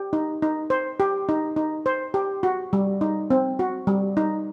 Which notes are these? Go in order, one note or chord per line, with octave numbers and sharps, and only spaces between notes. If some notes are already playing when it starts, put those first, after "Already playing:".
Already playing: G4
D#4
D#4
C5
G4
D#4
D#4
C5
G4
F#4
G3
D#4
C4
F#4
G3
D#4